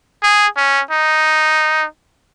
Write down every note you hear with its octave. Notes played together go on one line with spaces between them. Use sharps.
G#4
C#4
D#4